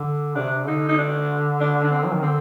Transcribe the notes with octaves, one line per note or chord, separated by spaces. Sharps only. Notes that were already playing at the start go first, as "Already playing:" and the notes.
Already playing: D3
C3 D4
D3 D#4
D#4
D4
D4
D4
C4
F#3
D#3
D3 C4